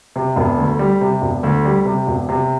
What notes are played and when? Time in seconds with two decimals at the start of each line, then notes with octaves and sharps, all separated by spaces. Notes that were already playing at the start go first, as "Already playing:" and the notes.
0.16 C3
0.36 E1
0.58 D2
0.79 G3
1.01 C3
1.22 E1
1.43 D2
1.65 G3
1.85 C3
2.07 E1
2.29 C3